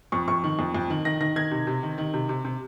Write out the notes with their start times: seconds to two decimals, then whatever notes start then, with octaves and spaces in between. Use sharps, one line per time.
0.12 F2 C#6
0.28 F2 C#6
0.44 D#3
0.59 F2
0.75 F2
0.90 D#3
1.05 D#3 A#6
1.21 D#3 A#6
1.36 D#3 G#6
1.51 C3
1.67 C3
1.83 D#3
1.98 D#3
2.14 C3
2.29 C3
2.45 C3